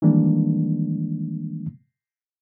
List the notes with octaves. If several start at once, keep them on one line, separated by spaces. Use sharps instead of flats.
D#3 E3 G3 G#3 A#3 D4